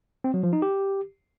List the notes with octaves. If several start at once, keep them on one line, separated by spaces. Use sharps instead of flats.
C4
F#3
F3
D#4
G4